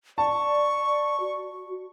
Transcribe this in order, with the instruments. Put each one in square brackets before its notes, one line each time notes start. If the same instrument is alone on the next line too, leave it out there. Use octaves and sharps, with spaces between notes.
[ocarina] D5 [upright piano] A5 [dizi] C#6
[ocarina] F#4